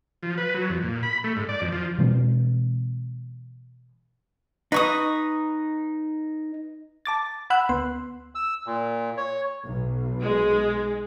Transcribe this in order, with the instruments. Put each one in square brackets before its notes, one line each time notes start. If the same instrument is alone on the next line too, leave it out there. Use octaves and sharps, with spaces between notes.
[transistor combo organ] F3
B4
F#3
F2
A#2
B5
A3
G#2
D5
F2
F3
[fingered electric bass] B2 E3 G#3 C4
[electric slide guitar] D#4 [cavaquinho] B4 C#6 D#6
[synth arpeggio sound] A5 D6 A6
F#5 B5 E6 F#6
D2 B3 C6
[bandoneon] E6
A#2
C#5
[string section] B1
[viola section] G#3